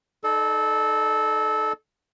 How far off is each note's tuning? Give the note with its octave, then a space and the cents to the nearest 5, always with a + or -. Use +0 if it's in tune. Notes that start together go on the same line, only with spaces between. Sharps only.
D#4 +0 A4 -20 D5 +35